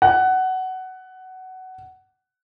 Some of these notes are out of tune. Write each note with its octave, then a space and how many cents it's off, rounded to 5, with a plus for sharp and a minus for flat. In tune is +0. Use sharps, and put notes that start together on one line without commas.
F#5 +15